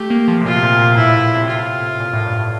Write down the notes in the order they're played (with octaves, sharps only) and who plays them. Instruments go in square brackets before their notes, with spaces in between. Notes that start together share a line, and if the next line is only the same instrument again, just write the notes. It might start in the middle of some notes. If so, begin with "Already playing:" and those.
Already playing: [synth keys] A3 [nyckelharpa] G4
[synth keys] A#3
F3
C3
[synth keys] A#2 [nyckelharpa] F4
[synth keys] C3
A#2
A#2
[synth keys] A2 [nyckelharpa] E4
[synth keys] A2
C3
[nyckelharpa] F4
[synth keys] A#2
A2
G2